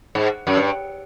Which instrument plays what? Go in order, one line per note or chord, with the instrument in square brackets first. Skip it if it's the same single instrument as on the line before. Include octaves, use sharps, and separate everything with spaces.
[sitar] G#2
F#2
G2